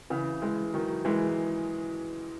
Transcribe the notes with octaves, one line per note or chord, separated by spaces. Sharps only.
C#3 E3
E3 G#3
D#3 F#3
E3 G#3